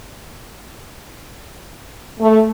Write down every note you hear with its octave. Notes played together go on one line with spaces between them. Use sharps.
A3